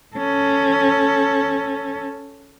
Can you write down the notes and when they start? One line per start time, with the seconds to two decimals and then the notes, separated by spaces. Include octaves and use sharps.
0.16 C#4 A4